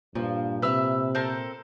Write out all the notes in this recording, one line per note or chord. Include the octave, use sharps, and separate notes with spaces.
G2 A#2 F3
C3 B4 E5 E6 F6
C4 A4 A#4 C5